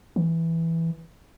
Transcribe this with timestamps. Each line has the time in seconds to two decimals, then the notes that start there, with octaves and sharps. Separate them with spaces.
0.16 E3